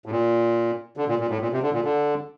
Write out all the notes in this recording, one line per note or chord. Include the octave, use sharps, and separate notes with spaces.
A2
A#2
D3
A#2
A#2
A2
A#2
C3
D3
A#2
D3